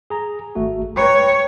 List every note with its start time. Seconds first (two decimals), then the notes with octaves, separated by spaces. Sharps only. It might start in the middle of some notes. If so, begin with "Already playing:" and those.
0.10 G#4 A#5
0.55 G#1 A3 F#4
0.97 B4 C#5 G5 A#5